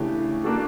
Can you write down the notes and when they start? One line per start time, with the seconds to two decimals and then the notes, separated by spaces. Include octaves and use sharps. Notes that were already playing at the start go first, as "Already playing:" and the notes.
Already playing: C#3 E3 A3 D4 G4
0.44 A#3 D4 F#4 A4